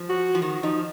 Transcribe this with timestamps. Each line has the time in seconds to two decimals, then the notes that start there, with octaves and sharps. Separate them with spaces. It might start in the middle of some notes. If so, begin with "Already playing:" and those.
Already playing: F3
0.09 F#4
0.35 F3
0.42 D#3 F#4
0.63 F3 D#4